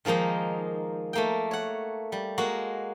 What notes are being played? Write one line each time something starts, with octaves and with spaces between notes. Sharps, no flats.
D#3 F3 G#3 A#3 D#4
A3 A#3 G5
C#5 F#5
G3
G#3 A#3 F#4